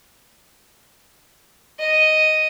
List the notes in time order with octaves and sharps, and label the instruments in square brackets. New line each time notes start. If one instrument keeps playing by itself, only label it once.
[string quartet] D#5